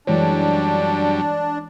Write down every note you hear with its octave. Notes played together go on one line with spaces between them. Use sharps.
F#2 E3 G3 G#3 D4 C#5